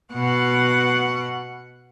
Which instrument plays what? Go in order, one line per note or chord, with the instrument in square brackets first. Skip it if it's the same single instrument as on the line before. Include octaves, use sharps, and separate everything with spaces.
[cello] B2 F#5